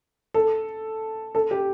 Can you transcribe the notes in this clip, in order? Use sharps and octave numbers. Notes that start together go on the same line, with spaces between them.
A4
A4
G4